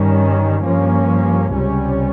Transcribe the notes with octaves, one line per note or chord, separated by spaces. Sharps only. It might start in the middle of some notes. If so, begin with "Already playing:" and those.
Already playing: G2 D#3 G3 C#4
G2 F3 A#3 C#4
C#2 C3 G3 C#4